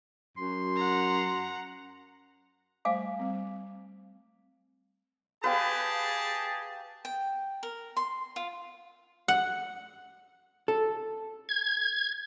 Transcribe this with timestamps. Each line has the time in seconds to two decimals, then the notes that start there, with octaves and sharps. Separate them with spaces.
0.37 F#2 C6
0.77 F#5 A#5
2.85 G3 A3 C5 F5 G#5 D6
3.19 G3 C4
5.44 G4 G#4 B4 F5 G5 A5
7.05 G5
7.63 A#4
7.97 C6
8.36 F4
9.28 F#5
10.68 A4
11.49 G#6